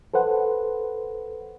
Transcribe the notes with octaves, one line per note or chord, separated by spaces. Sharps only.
A4 B4 C5 F#5